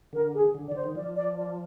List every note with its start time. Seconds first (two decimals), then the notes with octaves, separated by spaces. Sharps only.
0.13 D3 A#4
0.34 G#4
0.55 D3
0.68 D5
0.72 D3 C5
0.84 D#3
0.95 F3 D5
1.16 D5
1.37 D5